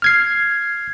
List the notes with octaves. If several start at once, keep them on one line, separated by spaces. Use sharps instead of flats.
F6 G#6 C7